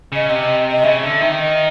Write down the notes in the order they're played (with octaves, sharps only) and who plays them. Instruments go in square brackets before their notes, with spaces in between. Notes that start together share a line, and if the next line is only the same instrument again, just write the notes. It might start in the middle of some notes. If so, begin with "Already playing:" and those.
[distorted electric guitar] C#3 [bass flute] D#5
[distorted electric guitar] C3 [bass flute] D#5
[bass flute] D#5
D#5
[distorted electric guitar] C#3 [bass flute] E5
[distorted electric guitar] D3
D#3
[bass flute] D#5